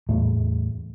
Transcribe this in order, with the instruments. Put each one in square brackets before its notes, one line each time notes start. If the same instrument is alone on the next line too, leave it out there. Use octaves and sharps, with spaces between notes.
[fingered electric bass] E2 A2 A3